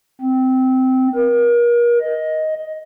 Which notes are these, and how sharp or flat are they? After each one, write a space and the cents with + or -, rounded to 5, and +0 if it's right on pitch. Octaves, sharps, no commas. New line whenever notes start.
C4 -15
A#4 +35
D#5 +10